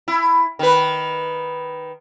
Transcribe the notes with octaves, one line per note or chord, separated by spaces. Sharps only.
E4
D#3 B4